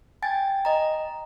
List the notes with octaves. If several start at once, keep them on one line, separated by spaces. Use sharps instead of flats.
G5 G#5 A6
D#5 A#5